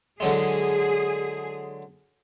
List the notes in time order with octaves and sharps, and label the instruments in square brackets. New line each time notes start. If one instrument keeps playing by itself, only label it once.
[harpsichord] D3 F#3 G#3 [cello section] G#4